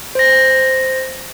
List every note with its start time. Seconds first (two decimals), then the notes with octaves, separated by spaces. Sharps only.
0.15 C5 A#6